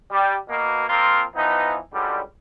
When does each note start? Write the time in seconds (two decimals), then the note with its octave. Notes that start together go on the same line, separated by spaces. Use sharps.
0.12 G3 G4
0.49 B2 A#3
0.89 F3 A#3 C4 F4 A#4
1.36 E3 F3 B3 D#4
1.94 C#2 D3 F#3 G3